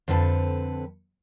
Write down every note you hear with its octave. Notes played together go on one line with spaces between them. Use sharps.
F2 D3 C4 B4 G#5 A5